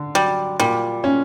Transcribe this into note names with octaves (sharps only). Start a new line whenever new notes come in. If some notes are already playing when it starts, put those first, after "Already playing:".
Already playing: D3
F#3 G3
A#2 G3
C#4